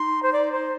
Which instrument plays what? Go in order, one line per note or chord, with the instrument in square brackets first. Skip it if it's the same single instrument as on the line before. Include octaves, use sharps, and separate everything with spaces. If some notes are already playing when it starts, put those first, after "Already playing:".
Already playing: [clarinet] D#4 [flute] C6
[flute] C5
D5
C5